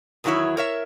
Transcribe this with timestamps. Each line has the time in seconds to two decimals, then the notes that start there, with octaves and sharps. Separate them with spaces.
0.24 E2 D#3 F#3 G3 E4 C#5
0.57 A#4 C#5 E5